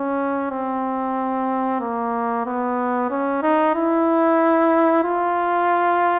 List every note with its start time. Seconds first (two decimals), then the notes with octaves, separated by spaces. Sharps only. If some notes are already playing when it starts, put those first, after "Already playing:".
Already playing: C#4
0.51 C4
1.81 A#3
2.46 B3
3.11 C#4
3.43 D#4
3.75 E4
5.04 F4